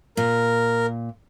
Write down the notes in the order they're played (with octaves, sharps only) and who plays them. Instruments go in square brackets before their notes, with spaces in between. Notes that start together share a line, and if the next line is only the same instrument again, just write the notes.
[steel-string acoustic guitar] A#2 [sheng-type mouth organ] A#4